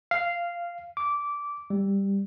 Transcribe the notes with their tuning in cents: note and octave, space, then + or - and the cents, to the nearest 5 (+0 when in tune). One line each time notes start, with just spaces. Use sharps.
F5 -10
D6 -15
G3 +10